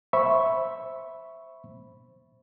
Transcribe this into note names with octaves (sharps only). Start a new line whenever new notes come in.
C5 E5 B5 C#6